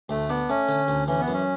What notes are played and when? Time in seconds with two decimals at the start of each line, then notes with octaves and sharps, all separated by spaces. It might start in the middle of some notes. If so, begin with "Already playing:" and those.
0.09 D2 A3
0.29 B3 D4
0.49 A3 C#4
0.69 D3
0.88 D2
1.08 E3 C#4
1.20 B3
1.28 F#2
1.33 C#4